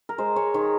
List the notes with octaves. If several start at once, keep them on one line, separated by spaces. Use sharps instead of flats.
A#4
G#3 C5
G#3 C#5
D#3 C#5